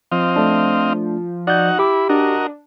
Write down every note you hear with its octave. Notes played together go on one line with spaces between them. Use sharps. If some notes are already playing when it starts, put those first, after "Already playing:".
F3 C4 D#5 F5
A3 D4
D#4 F#4 D5 F#5 G6
E4 G4 B5 D6
D4 F#4 A#4 D#5